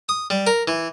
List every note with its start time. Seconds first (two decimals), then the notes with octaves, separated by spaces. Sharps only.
0.09 D#6
0.30 G3
0.47 A#4
0.68 E3